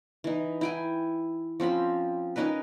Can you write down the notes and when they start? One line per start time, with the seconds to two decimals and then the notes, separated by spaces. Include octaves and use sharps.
0.24 E3 D#4
0.61 E4 G5 G#5
1.60 F3 C4 C#4 B5
2.36 C#4 D#4 A#4 B4